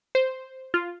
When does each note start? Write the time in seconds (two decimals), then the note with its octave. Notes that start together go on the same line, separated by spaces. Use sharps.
0.15 C5
0.74 F4